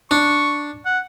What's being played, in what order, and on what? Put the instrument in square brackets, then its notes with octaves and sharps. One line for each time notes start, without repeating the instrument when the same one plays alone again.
[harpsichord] D4 [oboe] C#6
[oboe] F#5